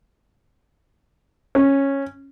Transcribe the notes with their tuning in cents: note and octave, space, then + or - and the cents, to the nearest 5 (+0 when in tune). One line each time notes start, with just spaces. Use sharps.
C#4 -10